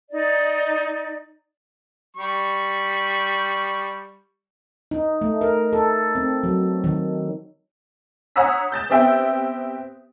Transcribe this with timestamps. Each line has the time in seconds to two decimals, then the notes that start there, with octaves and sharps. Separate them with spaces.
0.11 D#4 D5
2.17 G3 C#6
4.91 D#4
5.21 A3
5.41 A#4
5.72 A4
6.15 C4
6.43 F#3
6.84 D#3
8.36 C#5 F#5 A#5 D#6 E6 B6
8.72 G6 A6 E7
8.90 B3 C4 G4 E5 G5